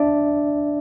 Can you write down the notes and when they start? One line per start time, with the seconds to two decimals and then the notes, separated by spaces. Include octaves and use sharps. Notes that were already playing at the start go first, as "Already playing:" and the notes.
Already playing: D4 D5 E5